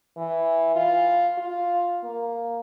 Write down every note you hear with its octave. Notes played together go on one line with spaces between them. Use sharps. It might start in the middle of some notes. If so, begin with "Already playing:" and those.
E3
F4
F4
A#3